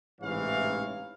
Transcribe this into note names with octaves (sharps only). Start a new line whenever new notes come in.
A1 G#2 C3 E3 C#5 F5